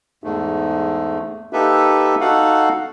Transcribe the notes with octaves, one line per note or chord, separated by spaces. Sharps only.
E2 G#2 A3
A#3 D#4 G4 A4 B4 E5
D#4 F#4 A4 F5 F#5